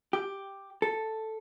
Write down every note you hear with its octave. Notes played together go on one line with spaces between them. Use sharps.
G4
A4